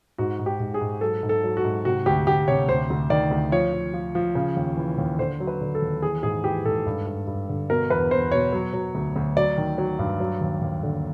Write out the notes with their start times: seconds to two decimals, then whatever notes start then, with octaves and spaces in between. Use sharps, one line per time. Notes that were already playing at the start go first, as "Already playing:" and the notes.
0.18 G#2 F#4
0.39 G#2
0.46 G4
0.60 G#2
0.74 G#4
0.81 G#2
1.01 F#3 A4
1.23 G#2
1.29 A4
1.44 F#3
1.57 F#4
1.64 G#2
1.85 C3 F#4
2.06 D2 G4
2.27 D2 G4
2.48 C3 C#5
2.68 D2 C5
2.90 D2
3.10 D#3 D5
3.31 D2
3.52 F3 C#5
3.73 F3
3.94 F3
4.15 F3
4.35 C#3
4.56 D#2
4.77 E3
4.98 D#2
5.19 D3 C5
5.40 F#3
5.47 B4
5.61 D3
5.75 A4
5.82 D#2
6.02 E3 G#4
6.23 G#2 G#4
6.44 E3 G4
6.65 G#2 A4
6.86 G2
7.07 G2
7.27 G2
7.49 D3
7.69 B2 A#4
7.90 E2 B4
8.11 E2 C5
8.32 B2 C#5
8.53 F#3
8.73 F#3
8.95 D2
9.16 D2
9.37 F#3 D5
9.58 D#3
9.78 F#3
9.99 G2
10.20 F#3
10.41 D#2
10.61 D#2
10.83 D3